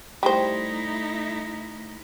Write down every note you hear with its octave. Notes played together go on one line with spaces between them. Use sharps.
G3 A3 D#4 E4 C5